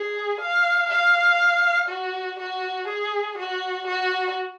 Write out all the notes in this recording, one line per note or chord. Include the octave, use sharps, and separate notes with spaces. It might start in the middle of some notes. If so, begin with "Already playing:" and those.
Already playing: G#4
F5
F5
F#4
F#4
G#4
F#4
F#4